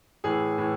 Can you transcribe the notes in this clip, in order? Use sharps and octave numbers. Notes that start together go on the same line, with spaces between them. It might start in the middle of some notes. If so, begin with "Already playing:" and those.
A2 E3 G#4
A2 E3